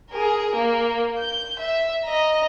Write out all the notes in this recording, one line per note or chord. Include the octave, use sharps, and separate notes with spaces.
G#4 A#4
A#3
G6
E5
D#5 A#5